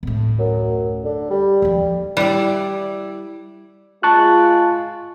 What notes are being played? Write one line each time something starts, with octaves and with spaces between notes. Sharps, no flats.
D1 A2
F#2
D3
G3
D#2 F3
G3 E4 D5
G#3 F4 A5 C#6 F#6